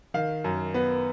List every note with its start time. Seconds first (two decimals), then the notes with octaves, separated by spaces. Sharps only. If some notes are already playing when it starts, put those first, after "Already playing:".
0.14 D#3 F5
0.44 F#2
0.74 B3